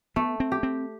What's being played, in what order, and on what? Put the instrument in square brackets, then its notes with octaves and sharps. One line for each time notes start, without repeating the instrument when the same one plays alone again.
[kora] A3 [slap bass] B3
[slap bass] C4
[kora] G4
[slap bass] C4